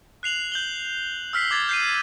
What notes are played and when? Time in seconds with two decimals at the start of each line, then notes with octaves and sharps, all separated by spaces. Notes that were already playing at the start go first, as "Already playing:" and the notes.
0.23 F#6 C7 F7 F#7
0.52 G6 F#7 G7
1.33 E6 F6 B6 C7
1.51 D6 G#6 A6
1.69 G6 C7 D#7